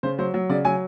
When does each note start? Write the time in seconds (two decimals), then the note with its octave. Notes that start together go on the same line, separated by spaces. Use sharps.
0.03 C#3 C5
0.18 F#3 C5
0.34 F#3
0.49 C#3 D5
0.65 F#3 G#5